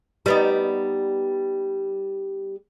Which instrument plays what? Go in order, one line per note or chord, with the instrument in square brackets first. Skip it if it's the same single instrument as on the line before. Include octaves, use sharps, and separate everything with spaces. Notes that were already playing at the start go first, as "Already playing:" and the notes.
[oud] G3 B3 D#4